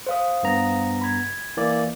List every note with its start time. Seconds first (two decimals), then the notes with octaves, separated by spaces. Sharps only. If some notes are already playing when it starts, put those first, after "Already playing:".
0.06 C5 F5 D#6
0.43 G2 B3 A#5
1.02 B5 G#6
1.57 E3 A#3 D5